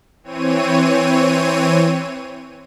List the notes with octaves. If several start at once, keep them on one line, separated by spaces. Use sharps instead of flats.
E3 C4 C#5 D#7